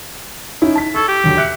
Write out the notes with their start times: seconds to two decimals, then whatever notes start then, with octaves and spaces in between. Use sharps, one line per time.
0.62 C#4 D#4 E4
0.75 A5 B6
0.95 A4 C#6 G#6
1.08 G4
1.24 D#2 D3 F#3
1.37 E5 F#6 C#7